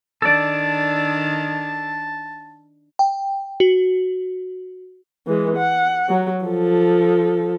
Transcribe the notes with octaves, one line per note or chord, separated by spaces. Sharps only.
D#3 D4 A4 D5 A5
G5
F#4
E3 G#3
F#5
F#3
F3 A4